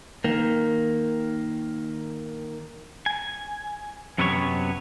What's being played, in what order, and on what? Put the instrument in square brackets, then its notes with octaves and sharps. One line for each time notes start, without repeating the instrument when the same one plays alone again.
[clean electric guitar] D#3 A#3
G#5
F#2 C3 F#3 B3 A4 C#5